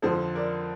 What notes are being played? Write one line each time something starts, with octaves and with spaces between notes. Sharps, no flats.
F2 D3 F3 A4 C5
A#4 D5